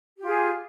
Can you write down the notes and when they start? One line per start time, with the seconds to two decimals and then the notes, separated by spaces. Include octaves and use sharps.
0.18 G4
0.22 F4
0.26 G#4